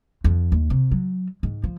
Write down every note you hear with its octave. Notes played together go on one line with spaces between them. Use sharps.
F2
D#2
C3
F#3
G#2
F3